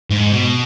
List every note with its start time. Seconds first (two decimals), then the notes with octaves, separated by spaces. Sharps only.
0.10 G#2
0.32 B2